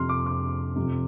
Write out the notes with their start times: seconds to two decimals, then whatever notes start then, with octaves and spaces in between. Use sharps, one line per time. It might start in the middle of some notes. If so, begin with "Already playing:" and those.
Already playing: F2 C3 C6 F6
0.09 D6
0.26 D6
0.76 F2 C3